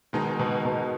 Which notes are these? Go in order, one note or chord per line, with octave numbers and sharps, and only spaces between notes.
B2 D#3 G#3 D#4
B2
B2